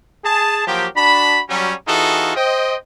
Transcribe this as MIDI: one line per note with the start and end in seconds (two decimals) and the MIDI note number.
0.25 0.63 68
0.25 0.63 81
0.67 0.87 53
0.67 0.87 54
0.67 0.87 58
0.67 0.87 67
0.96 1.41 62
0.96 1.41 66
0.96 1.41 81
0.96 1.41 83
1.50 1.73 54
1.50 1.73 55
1.50 1.73 61
1.88 2.33 52
1.88 2.33 63
1.88 2.33 65
1.88 2.33 66
1.88 2.33 68
1.88 2.33 69
2.36 2.76 72
2.36 2.76 75
2.36 2.76 79